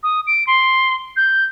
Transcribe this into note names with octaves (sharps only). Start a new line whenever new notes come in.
D#6
D7
C6
G6